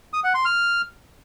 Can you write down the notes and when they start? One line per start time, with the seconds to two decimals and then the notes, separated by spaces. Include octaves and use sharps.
0.13 D#6
0.24 F#5
0.35 C6
0.45 F6